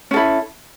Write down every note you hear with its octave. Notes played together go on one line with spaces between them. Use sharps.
C#4 E4 A4